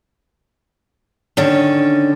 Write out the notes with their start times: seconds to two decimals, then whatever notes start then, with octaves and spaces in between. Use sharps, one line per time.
1.37 D3 D#3 C#4